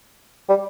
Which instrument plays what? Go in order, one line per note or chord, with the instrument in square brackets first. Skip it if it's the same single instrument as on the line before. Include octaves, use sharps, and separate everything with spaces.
[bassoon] G3